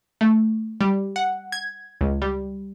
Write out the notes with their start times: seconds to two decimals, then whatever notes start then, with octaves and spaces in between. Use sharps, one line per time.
0.21 A3
0.81 G3
1.16 F#5
1.52 G#6
2.01 C#2
2.22 G3